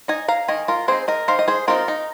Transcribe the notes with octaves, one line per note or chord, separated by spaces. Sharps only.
D#4 D#5 G#5
F5 A#5
D#3 D#5 G#5
F4 A#4
C4 D#4 G#4 C5
A#4 D#5
D#3 C5 F5
D#5
G#4 C5
C4 D#4 F4 A#4
D#4